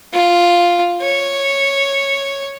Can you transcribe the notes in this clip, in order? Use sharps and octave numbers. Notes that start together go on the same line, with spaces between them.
F4
C#5